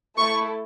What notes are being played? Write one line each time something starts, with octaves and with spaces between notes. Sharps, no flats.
A3 E4 A4 C#6